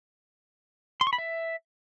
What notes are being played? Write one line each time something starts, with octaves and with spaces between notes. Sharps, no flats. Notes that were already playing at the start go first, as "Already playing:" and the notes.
C6
C#6
B5
E5